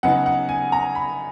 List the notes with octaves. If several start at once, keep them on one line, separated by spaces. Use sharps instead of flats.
C#3 F#3 B3 D#4 F#5
F#5
G#5
A#5
B5